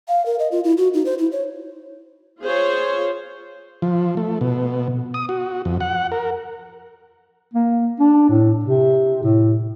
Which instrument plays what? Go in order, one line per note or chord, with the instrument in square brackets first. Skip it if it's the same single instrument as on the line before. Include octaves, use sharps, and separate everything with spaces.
[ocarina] F5
A#4
D#5
F4
E4
F#4
D#4
C5
E4
C#5
[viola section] F4 G#4 C5 C#5
[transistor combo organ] F3
A3
B2
D#6
F#4
F2
F#5
A#4
[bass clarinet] A#3
D4
A2
C3
A2